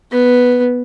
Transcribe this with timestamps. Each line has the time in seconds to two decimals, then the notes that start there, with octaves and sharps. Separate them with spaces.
0.12 B3